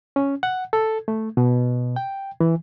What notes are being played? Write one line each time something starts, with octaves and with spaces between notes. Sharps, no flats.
C#4
F#5
A4
A3
B2
G5
E3